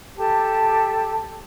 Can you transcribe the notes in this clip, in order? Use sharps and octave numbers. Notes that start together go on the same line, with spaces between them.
G4 A4 A5